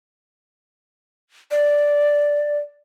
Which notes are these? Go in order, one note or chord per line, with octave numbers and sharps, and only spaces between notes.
D5